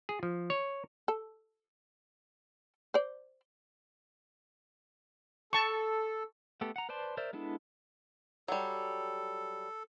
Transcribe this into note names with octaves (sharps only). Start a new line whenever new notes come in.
G#4
F3
C#5
A4
C5 D5
A4 A5 C#6
A3 B3 G4 A4
F#5 A#5
B4 C5 D5 A5 C6
A#4 C5 D5 E5
G#3 B3 D4 E4 A4
F#3 G3 A4